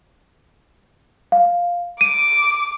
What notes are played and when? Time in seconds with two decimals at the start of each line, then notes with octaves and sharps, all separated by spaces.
1.32 F5
2.01 D6 D#7